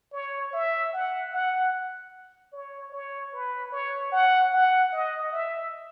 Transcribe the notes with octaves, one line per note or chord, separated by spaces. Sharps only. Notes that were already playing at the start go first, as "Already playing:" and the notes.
C#5
E5
F#5
F#5
C#5
C#5
B4
C#5
F#5
F#5
D#5
E5